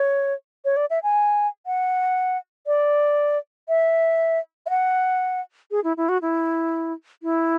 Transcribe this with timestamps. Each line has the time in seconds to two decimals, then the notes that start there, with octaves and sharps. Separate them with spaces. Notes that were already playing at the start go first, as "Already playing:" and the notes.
Already playing: C#5
0.65 C#5
0.77 D5
0.90 E5
1.03 G#5
1.67 F#5
2.67 D5
3.68 E5
4.66 E5
4.70 F#5
5.71 G#4
5.84 E4
5.97 E4
6.09 F#4
6.22 E4
7.23 E4